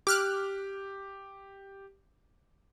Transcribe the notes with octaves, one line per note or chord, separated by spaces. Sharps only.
G4 D6 F6 F#6